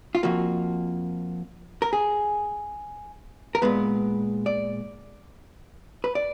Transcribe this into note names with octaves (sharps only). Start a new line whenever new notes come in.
F4
F2 F3 A#3 F#4
A#4
G#4
A#4
A#2 G#3 B3 B4
D5
B4
D5